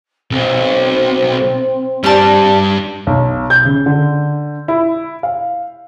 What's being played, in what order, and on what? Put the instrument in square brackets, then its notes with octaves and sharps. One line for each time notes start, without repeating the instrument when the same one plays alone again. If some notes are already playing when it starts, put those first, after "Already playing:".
[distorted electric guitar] B1 [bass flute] C4
[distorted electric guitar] G2 D4 [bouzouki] G3 A5
[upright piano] B1
G6
C#3
D3
E4
F5